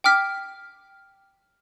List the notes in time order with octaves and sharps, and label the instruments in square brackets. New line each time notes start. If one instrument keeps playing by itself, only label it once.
[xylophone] G5 D6 F6 B6